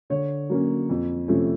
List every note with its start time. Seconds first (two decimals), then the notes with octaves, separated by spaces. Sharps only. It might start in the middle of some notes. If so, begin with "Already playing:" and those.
0.10 D3 C#5
0.50 F#3 A#3 C#4
0.90 F2
1.28 C3 F3 A3 C#4